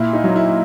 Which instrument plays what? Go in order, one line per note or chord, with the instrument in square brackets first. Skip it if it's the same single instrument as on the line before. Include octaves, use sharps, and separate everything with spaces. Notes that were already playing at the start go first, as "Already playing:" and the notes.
Already playing: [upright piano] A#2 [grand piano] E4
[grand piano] D#4
[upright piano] F#3
[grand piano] E4